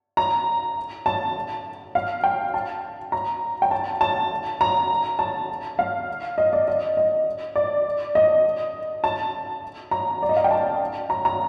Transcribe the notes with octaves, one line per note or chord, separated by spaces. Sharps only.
A#5
A5
F5
G5
A5
A#5
G5
A5
A5
A#5
A5
F5
D#5
D5
D#5
D#5
D5
D#5
A5
A#5
D5
D#5
F5
G5
A5
A#5
A#5